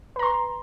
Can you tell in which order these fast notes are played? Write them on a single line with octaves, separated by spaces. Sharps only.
B4 A#5 C6